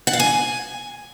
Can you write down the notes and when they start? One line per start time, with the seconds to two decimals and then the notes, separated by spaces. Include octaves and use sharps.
0.07 F#5
0.13 F5
0.20 G#5